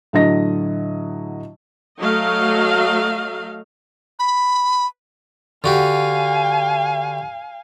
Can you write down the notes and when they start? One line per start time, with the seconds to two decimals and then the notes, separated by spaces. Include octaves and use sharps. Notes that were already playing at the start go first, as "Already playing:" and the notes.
0.13 A2 D3 F#3 D#5 A#6
1.99 F#3 A3 D#5 F5
4.19 B5
5.64 D3 F#4 G4 F5 G#5